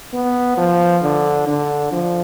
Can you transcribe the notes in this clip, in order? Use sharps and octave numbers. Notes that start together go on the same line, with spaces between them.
B3
F3
D3
D3
F3